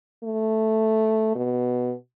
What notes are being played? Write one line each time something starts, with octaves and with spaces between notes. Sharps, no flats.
A3
B2